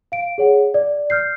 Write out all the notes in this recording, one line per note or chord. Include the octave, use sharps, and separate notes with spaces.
F5 D7
G#4 C#5 F#5
D5
F6 G6 C7